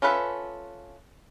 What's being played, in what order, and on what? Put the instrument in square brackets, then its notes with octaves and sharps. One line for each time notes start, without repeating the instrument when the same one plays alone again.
[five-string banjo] C#4 F4 A4 B4 E5